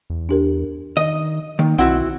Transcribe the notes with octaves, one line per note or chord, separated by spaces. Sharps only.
E2
D4 G4 A#4
D#3 D#5
D#3 A#3
B1 C4 E4 F#4 F#5